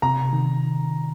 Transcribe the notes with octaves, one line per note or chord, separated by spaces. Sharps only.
C3 A#5
D#3